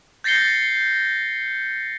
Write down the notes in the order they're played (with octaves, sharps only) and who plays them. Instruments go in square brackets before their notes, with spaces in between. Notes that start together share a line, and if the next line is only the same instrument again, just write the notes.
[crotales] G6 A6 A#6 C7 C#7 G7